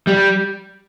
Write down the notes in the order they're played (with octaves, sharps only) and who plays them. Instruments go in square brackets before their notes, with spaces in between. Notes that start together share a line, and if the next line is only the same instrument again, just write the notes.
[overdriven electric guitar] G3